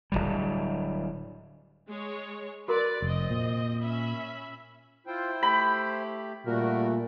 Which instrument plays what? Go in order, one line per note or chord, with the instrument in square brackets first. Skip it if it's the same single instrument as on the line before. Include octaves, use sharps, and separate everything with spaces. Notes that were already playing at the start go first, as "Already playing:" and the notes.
[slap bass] D1 B1 G3
[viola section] G#3 C#5
[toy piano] F#4 A#4 C6 [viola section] B4 D5
[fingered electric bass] F1 [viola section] C4 D#5
[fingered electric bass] A#2
[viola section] C#4 E5 B5
[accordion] E4 C5 G5 [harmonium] F4
[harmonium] A3 G4 [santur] B5
[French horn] A#2 [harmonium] G3 A3 [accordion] F#4 A#4